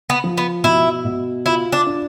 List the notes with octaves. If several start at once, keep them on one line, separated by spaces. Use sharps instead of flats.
B3
F3
B3
B2 E4
B2
E4 F4
D4
D4